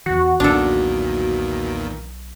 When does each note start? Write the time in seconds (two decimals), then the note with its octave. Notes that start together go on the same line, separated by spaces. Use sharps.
0.06 E2 E3 F#4
0.40 B1 E2 A#2 D#3 D4 A4